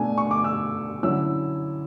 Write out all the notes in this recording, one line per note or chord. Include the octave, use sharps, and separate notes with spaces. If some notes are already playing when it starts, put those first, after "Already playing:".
Already playing: B2 A3 D4 G#5
C#6
D6
E6
D3 F#3 C#4 E4 E6